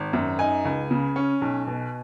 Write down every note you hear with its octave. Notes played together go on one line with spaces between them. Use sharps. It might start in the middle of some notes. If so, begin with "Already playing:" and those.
Already playing: G#1
F#2
D#4 G#5
C#2
C#3
C#4
B1
B2